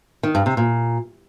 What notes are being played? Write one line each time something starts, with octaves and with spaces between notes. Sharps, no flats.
D#3
G2
C3
A#2